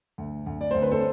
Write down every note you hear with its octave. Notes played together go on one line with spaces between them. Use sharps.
D2
D2
D5
D2 C5
B4
A4 C5